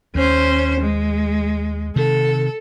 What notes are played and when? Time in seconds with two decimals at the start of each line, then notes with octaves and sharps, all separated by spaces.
0.15 D#2 C#4 C5
0.80 G#3
1.96 C3 D#3 A4